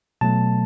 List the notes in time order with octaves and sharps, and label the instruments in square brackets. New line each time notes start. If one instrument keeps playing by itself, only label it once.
[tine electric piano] B2 F#3 A3 A5